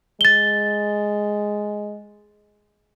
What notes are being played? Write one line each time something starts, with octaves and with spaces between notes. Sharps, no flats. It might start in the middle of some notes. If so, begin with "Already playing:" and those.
G#3 A6 G7